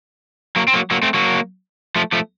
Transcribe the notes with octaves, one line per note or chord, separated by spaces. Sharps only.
F#3 A#3
C4
F#3 A#3
F#3 A#3
A3 C4
F#3 A#3
F3 A3
F3 A3